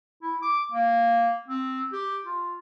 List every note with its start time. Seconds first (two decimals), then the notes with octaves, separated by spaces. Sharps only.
0.22 E4
0.42 D6
0.72 A#3
1.48 C4
1.92 G4
2.26 F4